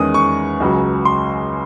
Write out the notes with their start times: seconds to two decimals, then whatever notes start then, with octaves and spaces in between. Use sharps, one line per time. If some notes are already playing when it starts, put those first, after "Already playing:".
Already playing: E2 D#3 G#3 C#4 D#6
0.14 C#6
0.60 C#2 C#3 F#3
1.05 C6